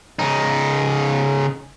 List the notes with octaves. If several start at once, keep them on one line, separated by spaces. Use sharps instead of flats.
C#3 D#4